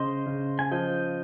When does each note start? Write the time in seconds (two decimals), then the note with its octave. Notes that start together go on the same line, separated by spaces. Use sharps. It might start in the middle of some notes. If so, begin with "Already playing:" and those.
Already playing: C#3 C5 D#5
0.26 C#3
0.59 G#5
0.71 F3 D#5 G5